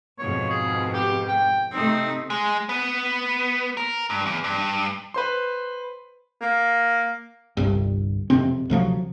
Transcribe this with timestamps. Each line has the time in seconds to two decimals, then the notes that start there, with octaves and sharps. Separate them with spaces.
0.19 F2 G#2 B2 C#5
0.50 G#4
0.94 G4
1.28 G5
1.73 C3 A3 C4 D#4
2.30 G#3
2.69 B3
3.77 A#4
4.10 G2
4.26 E2
4.44 G2
5.14 B4 C5 C6
6.41 A#3
7.57 G1 C2 G2
8.30 E1 F2 C3 C4
8.70 D2 C3 F3 F#3